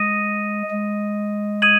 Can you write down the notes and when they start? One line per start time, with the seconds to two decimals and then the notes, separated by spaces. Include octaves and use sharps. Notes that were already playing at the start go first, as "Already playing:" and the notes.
Already playing: G#3 D#6 A#6 D#7
0.71 G#3
1.62 D#6 G#6 D#7 F#7